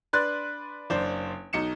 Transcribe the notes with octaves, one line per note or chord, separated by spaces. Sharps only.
D4 B4 C6 F#6 A6
F#1 D4 C5
B1 D#4 C#7 E7